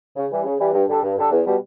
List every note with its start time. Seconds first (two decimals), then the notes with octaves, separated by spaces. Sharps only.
0.16 C#3
0.31 E3 G3
0.45 C#3
0.59 E3 G3
0.73 G2
0.88 D3 G3 D4 A4
1.03 G2
1.17 D3 G3 D4 A4
1.31 E2
1.45 B2 G3